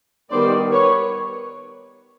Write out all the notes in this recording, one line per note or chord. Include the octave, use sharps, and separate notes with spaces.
D#3 G3 B3 C5 D5
B4 C#5